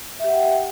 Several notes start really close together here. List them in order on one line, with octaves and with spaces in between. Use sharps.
E5 G4 F#5 G5